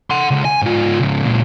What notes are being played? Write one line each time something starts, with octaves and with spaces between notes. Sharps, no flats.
F#5 C6
C#2
G#5
G#2 F4
G#2 C#3
C#2 A#2